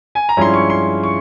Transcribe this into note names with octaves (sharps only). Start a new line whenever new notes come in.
G#5
A#5
G2 F3 G#3 C#4 E4 C6
C#6
C6
C#6